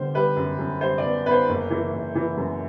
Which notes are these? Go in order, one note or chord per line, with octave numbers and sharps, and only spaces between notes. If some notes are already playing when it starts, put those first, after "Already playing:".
Already playing: D3 G3 B3 C5
G3 B4
F#2
F#2
G3 C5
D5
B3
B3 B4
C5
F#1
E3
F#1
E3
F#2